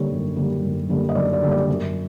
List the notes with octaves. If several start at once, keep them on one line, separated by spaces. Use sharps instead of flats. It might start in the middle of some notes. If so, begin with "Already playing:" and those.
Already playing: D3 G3 A#3 C#5
F#2
D3 G3 A#3
F#2
D3 G3 A#3
D#5
F#2 D5
D5
D3 G3 A#3
D5
F#2